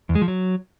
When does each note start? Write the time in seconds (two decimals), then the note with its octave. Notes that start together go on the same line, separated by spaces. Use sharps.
0.09 E2
0.15 G#3
0.22 F3
0.28 F#3